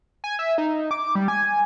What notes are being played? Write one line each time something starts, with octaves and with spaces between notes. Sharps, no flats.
G#5
E5
D#4
D6
G3
G#5